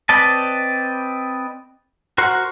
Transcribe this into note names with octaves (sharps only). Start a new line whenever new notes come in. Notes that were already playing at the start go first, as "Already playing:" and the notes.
C4 B4 D5 D#5 A5
F#4 A#4 C5 F#5